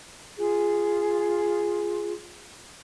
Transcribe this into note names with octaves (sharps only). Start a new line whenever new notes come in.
F4 G#4